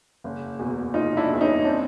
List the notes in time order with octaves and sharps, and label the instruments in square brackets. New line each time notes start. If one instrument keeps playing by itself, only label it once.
[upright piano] F#1
E2 B2
F#1 D#4 F4
D4 E4
E2 B2
C#4 D#4
C4 D4